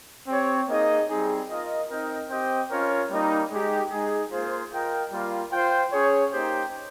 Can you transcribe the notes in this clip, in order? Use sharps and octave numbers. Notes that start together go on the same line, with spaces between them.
C4 G4 C#5
A#3 D#4 G#4 D#5
G3 C4 D#4 G#4
F4 A#4 D#5
C4 D#4 A#4 D#5 G5
C4 G4 C5 D#5 G5
C#4 F4 A#4 C#5
G3 A#3 D#4
G#3 D#4 G4
G#3 D#4 G#4
A#3 F4 G#4 C5
F4 A#4 D#5 G5
G3 A#3 F4
F4 C5 G5
C#4 G#4 C#5
A#3 D#4 G4 C5 G5